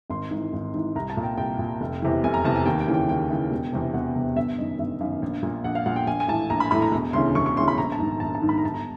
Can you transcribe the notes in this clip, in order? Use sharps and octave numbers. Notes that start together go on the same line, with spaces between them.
G#1 C6
G#2 E3
G#1
G#2 E3
C2 A#5
A5
A#2
G5
C2 G5
A#2
F1
E2 C3 E3
F1 G#5
A#5
E2 C3 E3 A5
G#5
D#2 G5
G5
C#3 E3
G5
D#2 G5
C#3 E3
E1
E2 C3
E1 F#5
E2 C3
G1 E5
F#2 D#3 D#5
G1 E5
F#2 D#3 F5
A#1
A#2
A#1 F#5
F5
A#2 F#5
G5
A#1 G#5
G#5
A2 E3 A5
A#1 A#5
B5
A2 E3 B5
A#5
E1
D2 C#3 E3 C6
E1 C#6
C#6
D2 C#3 E3 C6
B5
A#1 A#5
A5
G#2 D#3
A#1 A5
A5
G#2 D#3
B5
A#5
G1 A5
A#5